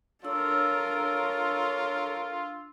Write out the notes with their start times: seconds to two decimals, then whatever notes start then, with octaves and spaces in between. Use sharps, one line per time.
0.24 D4 F4 A4 A#4 C#5 E6